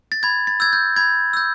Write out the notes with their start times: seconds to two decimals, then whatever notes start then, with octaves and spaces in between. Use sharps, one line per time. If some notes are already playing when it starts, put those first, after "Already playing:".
0.12 A6
0.23 B5 G#6
0.47 A6
0.60 E6 G6 G#6
0.73 G6
0.96 B5 G#6
1.33 E6 G6